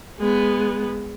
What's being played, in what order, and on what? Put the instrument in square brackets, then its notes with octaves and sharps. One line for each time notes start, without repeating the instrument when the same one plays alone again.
[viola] G#3 B3